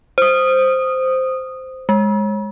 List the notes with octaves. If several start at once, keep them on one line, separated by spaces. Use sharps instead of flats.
C5 D#6
G#3